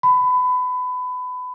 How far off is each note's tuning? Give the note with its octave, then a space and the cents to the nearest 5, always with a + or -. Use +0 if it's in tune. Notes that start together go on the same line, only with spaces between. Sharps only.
B5 +25